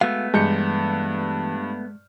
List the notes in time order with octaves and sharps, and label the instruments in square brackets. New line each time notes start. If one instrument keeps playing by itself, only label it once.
[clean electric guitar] G#3 F#4 F5 [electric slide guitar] A3 B3
[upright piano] G2 G6 C#7 [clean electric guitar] E3 [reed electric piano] G#3